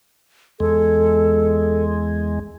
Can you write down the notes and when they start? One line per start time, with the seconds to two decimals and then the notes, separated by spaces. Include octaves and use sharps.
0.60 E2 G#3 A4